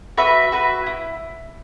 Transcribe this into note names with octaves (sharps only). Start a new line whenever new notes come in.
F#4 B4 E5
F#4 B4 E5
E4